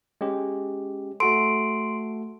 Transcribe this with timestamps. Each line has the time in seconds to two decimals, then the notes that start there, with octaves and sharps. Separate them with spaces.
0.21 G#3 C#4 G4
1.20 A3 F#4 A4 C6 D7